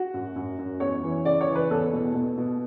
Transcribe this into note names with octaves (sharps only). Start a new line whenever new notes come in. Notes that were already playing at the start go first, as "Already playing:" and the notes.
Already playing: F#4
F#2
F#2
F#2
E2 C#5
E3
C#3 D5
C#5
E3
B4
E2 A4
B2
B2
B2